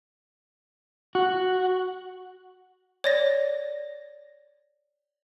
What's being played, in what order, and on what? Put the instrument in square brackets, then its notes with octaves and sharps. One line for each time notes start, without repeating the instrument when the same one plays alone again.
[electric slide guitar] F#4
[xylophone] C#5 D5 A#6